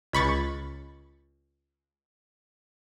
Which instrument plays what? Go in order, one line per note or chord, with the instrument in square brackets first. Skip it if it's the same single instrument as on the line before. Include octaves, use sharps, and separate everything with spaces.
[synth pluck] C#2 B5 C#6 A6